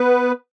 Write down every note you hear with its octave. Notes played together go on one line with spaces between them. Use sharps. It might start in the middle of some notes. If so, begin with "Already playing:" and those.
Already playing: B3 B4